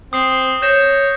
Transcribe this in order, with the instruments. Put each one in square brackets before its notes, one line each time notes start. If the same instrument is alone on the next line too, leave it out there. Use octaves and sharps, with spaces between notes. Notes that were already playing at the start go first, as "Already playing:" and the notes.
[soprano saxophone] C4 [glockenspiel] D#6 C7
[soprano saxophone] C#5 [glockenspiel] G6 A#6 E7